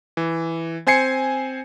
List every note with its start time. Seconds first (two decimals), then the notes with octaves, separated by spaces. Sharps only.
0.17 E3
0.87 C4 C5 G#5 G#6 C7 C#7